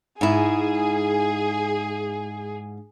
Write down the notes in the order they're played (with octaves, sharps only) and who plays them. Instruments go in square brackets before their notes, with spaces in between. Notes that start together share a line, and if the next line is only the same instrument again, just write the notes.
[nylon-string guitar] G#2 E4 [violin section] G#4